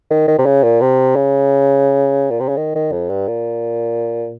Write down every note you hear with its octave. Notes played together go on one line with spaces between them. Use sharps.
D#3
D#3
C3
C#3
A#2
C3
C#3
A#2
C3
C#3
D#3
D#3
F2
G2
A#2